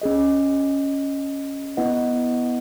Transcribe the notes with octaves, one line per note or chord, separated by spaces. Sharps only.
C#4 G#4 D#5
B3 E4 B4 D#5 F#5